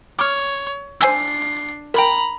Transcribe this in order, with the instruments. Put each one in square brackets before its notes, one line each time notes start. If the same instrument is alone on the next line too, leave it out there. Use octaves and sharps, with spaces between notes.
[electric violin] C#5 [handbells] D6 F6
[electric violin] D4 C7 [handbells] C5 G#5 E6
[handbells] A#4 G5 [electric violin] A#5 B5